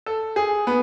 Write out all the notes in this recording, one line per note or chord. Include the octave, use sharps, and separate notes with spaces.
A4
G#4
B3